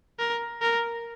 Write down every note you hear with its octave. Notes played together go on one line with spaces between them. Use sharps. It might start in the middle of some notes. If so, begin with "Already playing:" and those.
A#4
A#4